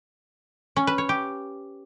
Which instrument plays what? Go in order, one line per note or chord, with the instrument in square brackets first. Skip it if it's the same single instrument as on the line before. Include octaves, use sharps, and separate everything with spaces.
[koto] C#4
B4
C#5
G4